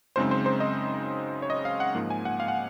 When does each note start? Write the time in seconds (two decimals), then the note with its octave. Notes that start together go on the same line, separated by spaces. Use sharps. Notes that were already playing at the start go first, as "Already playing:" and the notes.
0.16 F#2 C#3 G#3 C4 D#4 C5
0.31 C5
0.46 C5
0.60 D#5
1.42 C#5
1.50 D#5
1.65 F5
1.80 F#5
1.95 G#2 F3 A#3
2.10 G#5
2.25 F#5
2.40 F5
2.48 F#5